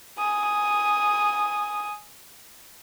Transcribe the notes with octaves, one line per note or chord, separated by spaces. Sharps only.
G#5 D#6